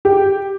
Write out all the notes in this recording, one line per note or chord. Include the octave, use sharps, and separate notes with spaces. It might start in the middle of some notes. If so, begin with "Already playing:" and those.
G4